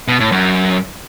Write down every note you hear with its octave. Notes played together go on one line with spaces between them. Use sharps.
B2
A2
F#2